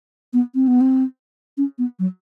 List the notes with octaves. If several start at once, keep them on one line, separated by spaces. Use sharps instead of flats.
B3
C4
B3
C4
C#4
B3
F#3